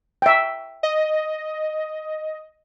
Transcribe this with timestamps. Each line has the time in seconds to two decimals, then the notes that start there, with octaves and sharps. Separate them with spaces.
0.22 E5 G5
0.83 D#5